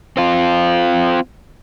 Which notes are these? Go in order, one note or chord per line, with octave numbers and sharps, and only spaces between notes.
C4 F4